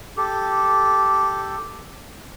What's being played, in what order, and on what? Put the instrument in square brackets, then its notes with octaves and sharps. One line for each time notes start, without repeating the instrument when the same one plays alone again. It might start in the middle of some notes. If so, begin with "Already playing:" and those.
[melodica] G4 A4